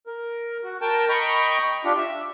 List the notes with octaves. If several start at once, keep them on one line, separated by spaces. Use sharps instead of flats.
A#4
F#4
A#4 G5 A5
D#5 G5 A#5 B5 C#6
D4 F4 G4
E5